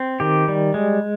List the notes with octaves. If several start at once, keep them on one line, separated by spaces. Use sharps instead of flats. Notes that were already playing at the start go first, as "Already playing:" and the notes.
Already playing: C4
D#3 G4
G3
G#3